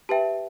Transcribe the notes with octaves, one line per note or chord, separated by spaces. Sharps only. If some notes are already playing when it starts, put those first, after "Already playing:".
G4 B4 E5 G5 A5